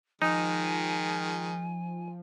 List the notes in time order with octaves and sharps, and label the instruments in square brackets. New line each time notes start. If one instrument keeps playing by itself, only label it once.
[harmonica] D#3 G#3 [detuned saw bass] F3 [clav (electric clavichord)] D#4 [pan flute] G#5